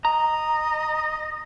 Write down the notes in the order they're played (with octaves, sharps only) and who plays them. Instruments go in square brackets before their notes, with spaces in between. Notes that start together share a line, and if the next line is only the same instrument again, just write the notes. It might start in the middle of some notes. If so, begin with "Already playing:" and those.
[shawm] D#5 [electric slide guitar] A#5